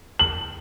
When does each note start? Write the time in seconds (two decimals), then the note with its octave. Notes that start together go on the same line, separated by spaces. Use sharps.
0.19 F#7